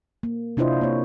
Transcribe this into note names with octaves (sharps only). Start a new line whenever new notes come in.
A#3
C3 D4 E4 F4 C5 D#5
A#3 C#5